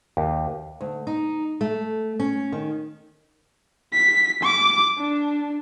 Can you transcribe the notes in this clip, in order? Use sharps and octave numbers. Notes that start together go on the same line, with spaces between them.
D#2
D2
D#4
A3
C#4
D#3
B6
D6
D4